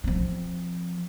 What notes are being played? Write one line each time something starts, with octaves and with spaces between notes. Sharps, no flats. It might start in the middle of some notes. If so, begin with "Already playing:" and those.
F3 C4